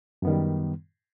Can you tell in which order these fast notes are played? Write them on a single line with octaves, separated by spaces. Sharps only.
F#2 B3 D#3 G3